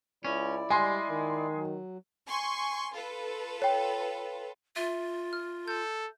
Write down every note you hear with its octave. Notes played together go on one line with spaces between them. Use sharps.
C#2 C#4 E4 D5
G3 G#3 G#5 C6
D#3
F#3
G#5 C6 C#6
F4 A4 B4
C#5 G5
F4 E5 D#7
F6
A4 G6